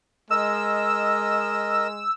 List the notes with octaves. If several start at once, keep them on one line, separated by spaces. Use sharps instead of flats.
G#3 A#4 D#5 E6